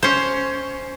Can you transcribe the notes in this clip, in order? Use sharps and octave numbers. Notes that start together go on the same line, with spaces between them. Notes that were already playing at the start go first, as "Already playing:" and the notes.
C#4 C5